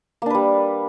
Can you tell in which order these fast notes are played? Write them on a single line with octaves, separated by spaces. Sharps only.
A#3 D4 B4 G3